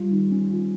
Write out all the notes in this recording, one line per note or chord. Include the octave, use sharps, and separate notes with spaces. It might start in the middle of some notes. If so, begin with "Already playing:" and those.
Already playing: G3 F4
D#3
C#4
F4